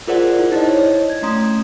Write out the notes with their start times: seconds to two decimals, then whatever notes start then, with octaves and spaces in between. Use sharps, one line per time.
0.07 F4 G#4 A#4 C5 D5 F#5
0.39 E4
0.52 D#4 E4 C5 D5 D#5
0.67 C#5
1.10 G#6
1.22 A3 C#4 A#5 C6 D#6